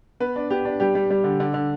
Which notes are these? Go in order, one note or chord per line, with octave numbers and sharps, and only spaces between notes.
B3 B4
D4
B3 G4
D4
G3 G4
G3
G3
D3
D3
D3